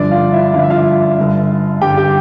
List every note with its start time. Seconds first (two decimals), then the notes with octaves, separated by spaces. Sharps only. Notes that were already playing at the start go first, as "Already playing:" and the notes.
Already playing: G1 G2 F3 D4 D5
0.11 F4 F5
0.33 E4 E5
0.53 G1 G2 F3 F5
0.63 E5
0.70 F4 F5
1.17 G1 G2 D3
1.81 G1 G2 D3 G4 G5
1.97 G4 G5